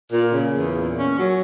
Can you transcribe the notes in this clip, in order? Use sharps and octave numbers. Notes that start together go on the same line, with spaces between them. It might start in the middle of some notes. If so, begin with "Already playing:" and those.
A#2
C#3
E2
A#2
C#4
F#3